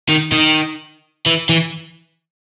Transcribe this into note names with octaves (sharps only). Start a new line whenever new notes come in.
D#3
D#3
E3
E3